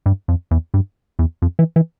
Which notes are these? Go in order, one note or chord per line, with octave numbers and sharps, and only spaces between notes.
G2
F2
E2
G2
E2
F2
E3
E3